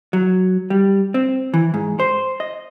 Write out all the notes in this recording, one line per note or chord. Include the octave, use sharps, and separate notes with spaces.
F#3
G3
C4
E3
G#2
C5
D#5